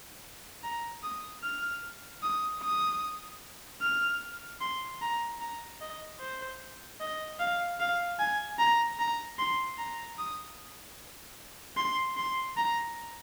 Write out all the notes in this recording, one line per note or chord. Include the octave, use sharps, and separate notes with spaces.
A#5
D#6
F6
D#6
D#6
F6
C6
A#5
A#5
D#5
C5
D#5
F5
F5
G#5
A#5
A#5
C6
A#5
D#6
C6
C6
A#5